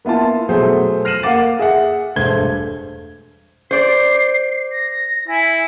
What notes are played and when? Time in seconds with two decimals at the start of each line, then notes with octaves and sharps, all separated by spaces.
0.05 A#3 B3 E4 F4 A5
0.49 B2 F#3 A3 G#4 C5
1.05 F6 A#6 C7 D#7 E7 F#7
1.23 A#3 F5 F#5 D6 A6
1.59 G#4 E5 F#5
2.16 E1 G2 A3 C5 G#6 G7
3.71 C5 D5 C7
4.71 A#6
5.28 E4 G#5